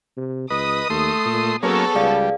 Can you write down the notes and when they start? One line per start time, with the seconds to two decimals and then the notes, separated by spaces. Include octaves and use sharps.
0.17 C3
0.50 C#2 B4 D#5 D#6
0.90 D#2 A3 C6
1.26 A#2
1.63 F#3 A#3 B3 C#4 G#4 A4 C#5 C#6
1.95 C#2 G3 G#4 D5 F5